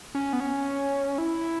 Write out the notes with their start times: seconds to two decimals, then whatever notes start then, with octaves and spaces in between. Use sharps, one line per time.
0.15 C#4
0.33 B3
0.40 C#4
1.18 E4